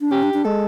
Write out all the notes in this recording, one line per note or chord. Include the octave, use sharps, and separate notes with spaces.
D4
C#4 G4
D4
D4
G#3 A4